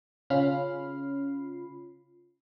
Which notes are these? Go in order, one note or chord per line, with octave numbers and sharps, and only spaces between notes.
C#3 C#4 F4 B5 F6 C7